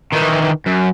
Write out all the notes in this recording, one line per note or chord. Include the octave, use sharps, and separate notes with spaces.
D#3 E3
F#2